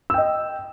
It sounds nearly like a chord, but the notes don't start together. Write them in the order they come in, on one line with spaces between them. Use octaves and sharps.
E6 G5 D#5